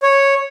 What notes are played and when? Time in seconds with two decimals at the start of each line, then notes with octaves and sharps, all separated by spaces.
0.03 C#5